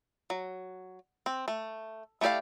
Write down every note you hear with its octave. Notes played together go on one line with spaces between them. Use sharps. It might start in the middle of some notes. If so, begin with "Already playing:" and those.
F#3
C4
A3
A3 E4 G4 D5 F5